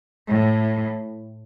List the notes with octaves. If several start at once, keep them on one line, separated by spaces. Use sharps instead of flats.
A2